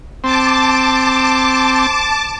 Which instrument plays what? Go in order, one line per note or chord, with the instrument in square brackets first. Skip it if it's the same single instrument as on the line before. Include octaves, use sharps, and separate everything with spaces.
[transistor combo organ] C4 [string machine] A5 D6